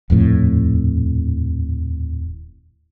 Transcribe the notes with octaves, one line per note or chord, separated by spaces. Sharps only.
D#1 F2 A2